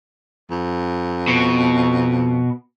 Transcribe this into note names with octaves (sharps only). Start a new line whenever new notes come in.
F2
B2